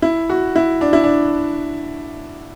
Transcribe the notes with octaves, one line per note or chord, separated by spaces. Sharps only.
E4
F#4
E4
D4
E4
D4